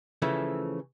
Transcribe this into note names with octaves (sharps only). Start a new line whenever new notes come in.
C#3 E3 F3 A3